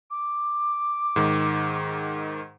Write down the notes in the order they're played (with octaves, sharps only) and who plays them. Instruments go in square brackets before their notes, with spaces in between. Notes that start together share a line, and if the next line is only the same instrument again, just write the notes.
[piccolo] D6
[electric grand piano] G#2 D#3